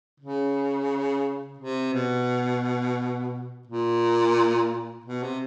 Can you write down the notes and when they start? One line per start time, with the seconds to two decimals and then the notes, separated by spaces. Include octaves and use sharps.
0.20 C#3
1.58 C3
1.93 B2
3.67 A#2
5.05 B2
5.23 C3